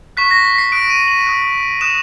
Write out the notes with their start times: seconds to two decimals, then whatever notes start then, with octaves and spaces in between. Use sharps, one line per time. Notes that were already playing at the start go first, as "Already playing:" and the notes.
0.17 C#6 F#6 B6
0.31 A#6
0.45 B6
0.58 C7
0.72 D#6 F#6 D7
0.90 D#7
1.08 F#7
1.27 D#6 F#6
1.81 D#6 F#6 E7